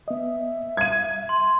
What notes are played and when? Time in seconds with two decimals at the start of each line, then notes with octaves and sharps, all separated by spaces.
0.08 B3 D#5 E5
0.77 G3 F5 G#6 D#7
1.29 C6